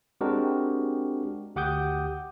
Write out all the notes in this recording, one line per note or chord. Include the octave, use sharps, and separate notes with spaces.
G#3 C4 D4 F#4 G4 A#4
D2 G4 F#5 D6 D#6 G6